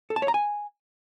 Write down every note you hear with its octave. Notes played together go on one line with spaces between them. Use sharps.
A4
A5
C#5
A#5
G#5